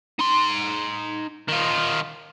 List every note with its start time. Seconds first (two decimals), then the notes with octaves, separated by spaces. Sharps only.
0.19 D#4 C6
1.49 D#3 F4